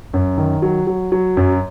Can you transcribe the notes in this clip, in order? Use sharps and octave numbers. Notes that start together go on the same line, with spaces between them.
F#2
D#3
F#3
F#3
F#3
F#2